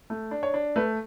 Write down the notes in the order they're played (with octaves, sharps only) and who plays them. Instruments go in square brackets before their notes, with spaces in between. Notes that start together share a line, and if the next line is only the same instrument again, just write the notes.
[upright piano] A3
D4
[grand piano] C#5
[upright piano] D4
[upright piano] A3 [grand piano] B4